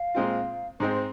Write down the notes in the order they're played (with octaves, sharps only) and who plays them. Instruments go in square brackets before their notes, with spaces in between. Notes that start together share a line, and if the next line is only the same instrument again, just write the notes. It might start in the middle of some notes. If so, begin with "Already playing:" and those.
Already playing: [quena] F5
[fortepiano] A#2 G#3 C4 F4
[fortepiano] G#2 G#3 C4 [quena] C5